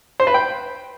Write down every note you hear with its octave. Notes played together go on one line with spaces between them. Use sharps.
C5
B4
G5